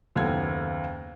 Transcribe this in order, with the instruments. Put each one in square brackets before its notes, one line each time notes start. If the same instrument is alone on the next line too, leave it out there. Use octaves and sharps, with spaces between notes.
[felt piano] F#1 D#2 B3 A4 G#6